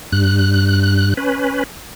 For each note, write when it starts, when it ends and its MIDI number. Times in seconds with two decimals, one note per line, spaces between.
0.12 1.14 43
0.12 1.14 90
1.17 1.63 61
1.17 1.63 71